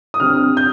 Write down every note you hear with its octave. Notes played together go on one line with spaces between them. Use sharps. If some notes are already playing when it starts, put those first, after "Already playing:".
D#6
D3 G3 C4 F6
G6